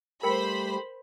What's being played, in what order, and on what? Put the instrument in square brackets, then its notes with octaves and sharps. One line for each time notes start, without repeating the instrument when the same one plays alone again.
[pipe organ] G3 A3 G4 [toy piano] A#4 G5 [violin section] C5 B5